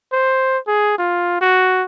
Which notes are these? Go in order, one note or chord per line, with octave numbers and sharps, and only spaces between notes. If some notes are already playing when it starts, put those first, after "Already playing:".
C5
G#4
F4
F#4